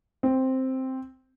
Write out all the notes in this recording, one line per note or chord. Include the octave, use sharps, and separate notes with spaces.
C4